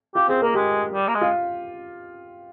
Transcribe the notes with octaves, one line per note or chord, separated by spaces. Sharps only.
F4 G4
C4 G#4
A#3 A#4
G#3 G4
G3
A#3
G#3
F4